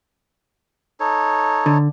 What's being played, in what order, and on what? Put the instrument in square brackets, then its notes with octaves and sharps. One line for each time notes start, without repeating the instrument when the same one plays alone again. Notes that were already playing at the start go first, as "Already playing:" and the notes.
[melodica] D#4 A4 C#5
[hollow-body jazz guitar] D3